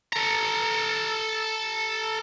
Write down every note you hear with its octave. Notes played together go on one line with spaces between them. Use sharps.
A4 A#5